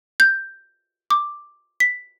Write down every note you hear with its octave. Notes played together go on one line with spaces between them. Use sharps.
G6
D6
B6